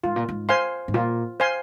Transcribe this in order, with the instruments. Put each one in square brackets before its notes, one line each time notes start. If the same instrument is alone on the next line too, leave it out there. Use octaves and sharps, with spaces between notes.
[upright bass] G#2 [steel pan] F4
[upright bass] A#2
G#2
[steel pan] C5 F5 G#5 C6
[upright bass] G#2
[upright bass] A#2 [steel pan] F4
[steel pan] C5 F5 G#5 C6